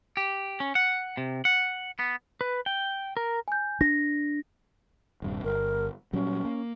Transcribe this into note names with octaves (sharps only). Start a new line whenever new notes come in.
G4
C#4
F#5
C3
F#5
B3
B4
G5
A#4
G#5 G6
D4 A#6
D#1 G2 C3
G1 A#4
A#2 F#3 G3 C#4
A#3